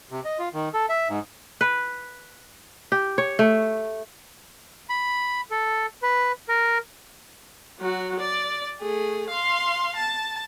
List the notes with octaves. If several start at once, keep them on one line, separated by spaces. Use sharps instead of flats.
C3
D#5
F4
D#3
A4
E5
G#2
B4
G4
C#5
A3
B5
A4
B4
A#4
F#3 F#4
D5
A3 G#4
F5 C6
A5